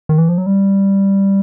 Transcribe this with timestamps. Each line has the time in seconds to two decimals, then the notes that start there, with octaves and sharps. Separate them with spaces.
0.09 D#3
0.18 E3
0.29 F3
0.38 F#3
0.46 G3